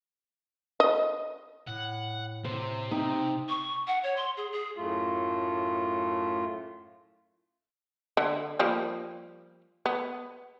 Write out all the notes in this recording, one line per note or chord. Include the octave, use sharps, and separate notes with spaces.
D#5
A2 F#5
C3 C5
C4 D#4
C#6
F#5
C#5
C6
G#4
G#4
F#2 A2 A3 F4
D3
F3 G3 A#3
B3